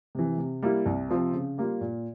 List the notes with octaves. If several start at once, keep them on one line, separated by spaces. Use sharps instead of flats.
C3 E3
C3
G3 A#3 E4
C2
C3 F3 C4
C#3
G3 A#3 F4
A#2